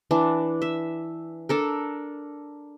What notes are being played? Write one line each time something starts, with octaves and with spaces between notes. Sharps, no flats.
E3 D4
E5
D4 A4 A#4